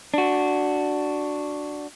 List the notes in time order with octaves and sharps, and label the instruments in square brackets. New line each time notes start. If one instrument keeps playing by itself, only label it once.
[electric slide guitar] D4 F#4